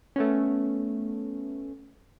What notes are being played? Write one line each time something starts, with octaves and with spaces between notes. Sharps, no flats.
A3 B3 C#4